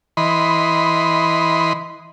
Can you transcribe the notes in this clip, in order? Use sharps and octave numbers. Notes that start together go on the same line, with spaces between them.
E3 D#5 B5 C6